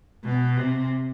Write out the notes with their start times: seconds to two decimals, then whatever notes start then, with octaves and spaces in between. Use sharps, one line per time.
0.25 B2
0.57 C3